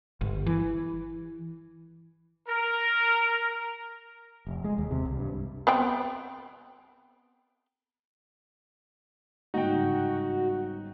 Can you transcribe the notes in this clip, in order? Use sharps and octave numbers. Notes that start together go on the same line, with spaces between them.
G1
E3
A#4
F1
G#3
D#2
C3
C2
G2
B3 C4 G5
G1 G#2 C#3 D#4 F#4 G5